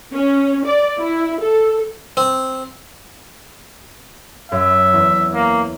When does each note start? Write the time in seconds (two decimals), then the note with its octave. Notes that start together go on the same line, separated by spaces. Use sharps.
0.13 C#4
0.65 D5
0.98 E4
1.41 A4
2.17 C4
4.52 F#2 E5
4.93 E2
5.34 A#3